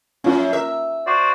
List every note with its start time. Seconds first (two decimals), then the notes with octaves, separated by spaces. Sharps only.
0.24 F#2 C#4 F4
0.53 A#4 E5
1.07 F#4 C5 D5